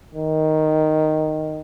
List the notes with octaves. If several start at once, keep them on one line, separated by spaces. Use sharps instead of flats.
D#3